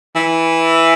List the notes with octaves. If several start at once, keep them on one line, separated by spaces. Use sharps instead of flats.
E3